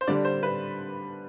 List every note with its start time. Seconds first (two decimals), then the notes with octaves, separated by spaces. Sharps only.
0.01 C5
0.07 D3 G3 D4 D5
0.25 C5
0.43 B4